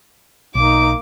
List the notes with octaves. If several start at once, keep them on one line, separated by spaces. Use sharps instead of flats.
B1 A#3 D#4 D6